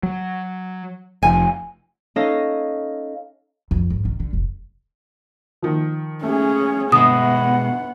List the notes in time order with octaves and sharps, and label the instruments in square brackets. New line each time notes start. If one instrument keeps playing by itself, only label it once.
[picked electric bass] F#3
[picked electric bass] F1 F3 [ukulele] G#5
[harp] C#4 D#4 A4 D#5 F5
[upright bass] F2
G#2
D#3
D3
F1
[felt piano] D#3 F3
[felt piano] A3 [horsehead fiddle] C#4 G#4
[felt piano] G1 D3 [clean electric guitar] B2 G#3 [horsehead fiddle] B3 F#5 [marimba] D#6